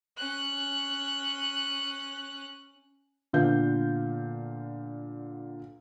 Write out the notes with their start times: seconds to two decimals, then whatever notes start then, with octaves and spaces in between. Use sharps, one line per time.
0.17 C#4 F#6
3.33 A#2 D3 B3 F5 G6